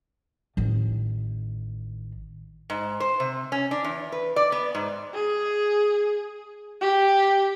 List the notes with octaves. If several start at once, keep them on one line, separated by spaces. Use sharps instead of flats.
A1 D#3
G#2
C5
C3
C#4
D4
E2
B4
D5
B3
G#2
G#4
G4